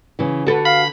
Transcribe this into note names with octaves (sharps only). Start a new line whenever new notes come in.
C#3 E3
D3 F#4 A4 B4
F5 B5